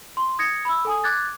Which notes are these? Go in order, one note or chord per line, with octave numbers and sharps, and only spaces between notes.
C6
D#6 G#6 A#6 C#7
B5 E6
A4 G#5 D#6
D6 F#6 G#6 A6